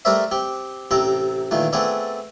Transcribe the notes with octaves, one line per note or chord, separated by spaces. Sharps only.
G3 A3 A#4 C5 D5 E5
C4 G4
A1 C3 C4 A4 A5 A#5
A#2 D#3 E3 A3
A3 B3 C4 G#4 A4 D5